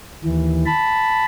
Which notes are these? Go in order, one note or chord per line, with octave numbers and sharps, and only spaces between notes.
D#2 E3
A5 B5